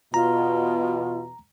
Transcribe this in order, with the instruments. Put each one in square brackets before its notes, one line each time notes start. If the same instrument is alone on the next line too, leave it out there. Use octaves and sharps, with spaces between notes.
[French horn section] E2 B2 [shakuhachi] F4 [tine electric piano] A#5